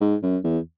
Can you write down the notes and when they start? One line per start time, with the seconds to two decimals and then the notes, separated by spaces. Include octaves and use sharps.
0.01 G#2
0.23 F#2
0.44 E2